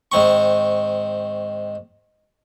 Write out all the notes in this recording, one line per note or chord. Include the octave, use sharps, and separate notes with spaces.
G#2 D#3 C4 C#6